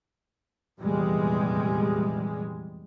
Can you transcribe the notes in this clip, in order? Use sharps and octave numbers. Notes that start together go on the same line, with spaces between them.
F1 E2 A#2 G3 G#3